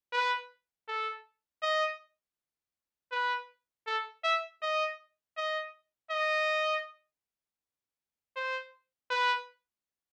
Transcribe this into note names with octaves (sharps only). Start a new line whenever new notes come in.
B4
A4
D#5
B4
A4
E5
D#5
D#5
D#5
C5
B4